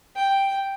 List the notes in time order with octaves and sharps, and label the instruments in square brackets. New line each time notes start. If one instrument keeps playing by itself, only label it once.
[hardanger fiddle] G5